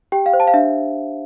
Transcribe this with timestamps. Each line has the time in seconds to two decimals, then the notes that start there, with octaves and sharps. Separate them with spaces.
0.12 G4 G5
0.26 F5
0.33 C5
0.40 A5
0.47 F5
0.54 D4 E5